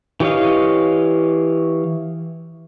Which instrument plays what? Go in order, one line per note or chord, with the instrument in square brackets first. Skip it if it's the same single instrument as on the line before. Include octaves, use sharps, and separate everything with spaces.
[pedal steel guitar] E3 G4 C#5 D#5 F5